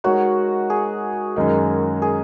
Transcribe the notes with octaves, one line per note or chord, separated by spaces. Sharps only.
G#3 D#4 F#4 A#4 C#5
G#4
F#2 D#3 G#3 D#4 A#4
G#4